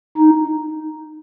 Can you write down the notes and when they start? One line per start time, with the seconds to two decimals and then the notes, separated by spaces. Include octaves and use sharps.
0.17 D#4